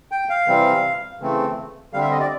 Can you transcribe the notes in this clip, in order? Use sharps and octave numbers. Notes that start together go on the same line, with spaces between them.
G5
F5
C3 E3 G3 C4
C#3 E3 A3 C4
D3 G3 C4 F5
E5
D#5
D5